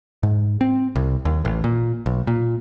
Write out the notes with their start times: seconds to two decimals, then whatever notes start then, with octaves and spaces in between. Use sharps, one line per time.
0.23 G#2
0.61 C4
0.96 C2
1.25 D#2
1.45 A1
1.64 A#2
2.06 B1
2.27 A#2